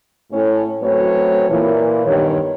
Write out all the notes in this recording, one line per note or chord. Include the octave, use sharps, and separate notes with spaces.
A2 C#4
F#3 A3 C4 C#4 B4 C#5
A#2 E3
G2 D#3 B3 C#5